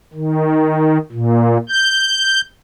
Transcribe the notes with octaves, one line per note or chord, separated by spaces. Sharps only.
D#3
A#2
G6